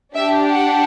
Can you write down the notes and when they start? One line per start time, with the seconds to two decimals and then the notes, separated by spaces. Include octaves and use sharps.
0.15 D4 G4 E5
0.51 F#5